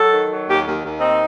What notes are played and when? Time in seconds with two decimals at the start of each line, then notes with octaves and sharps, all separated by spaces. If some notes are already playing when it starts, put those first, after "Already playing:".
Already playing: F#3 A4
0.11 D#3
0.30 F#3
0.47 D#2 G4
0.65 D#2
0.83 D#2
1.00 C4 D#4